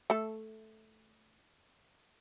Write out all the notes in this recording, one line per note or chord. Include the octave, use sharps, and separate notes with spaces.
A3 A4